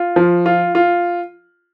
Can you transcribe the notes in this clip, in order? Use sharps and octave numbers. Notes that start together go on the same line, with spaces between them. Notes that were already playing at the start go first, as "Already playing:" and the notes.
Already playing: F4
F3
F4
F4